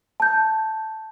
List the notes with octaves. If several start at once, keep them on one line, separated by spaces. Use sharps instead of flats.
A5 G6